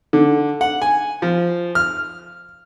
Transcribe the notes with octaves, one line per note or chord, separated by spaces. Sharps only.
D3
F#5
G#5
F3
F6